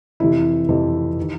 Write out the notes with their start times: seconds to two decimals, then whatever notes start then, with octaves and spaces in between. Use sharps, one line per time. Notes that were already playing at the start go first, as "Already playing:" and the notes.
0.20 F2 C3 E3 E4
0.69 F2 C3 E3
1.21 D#3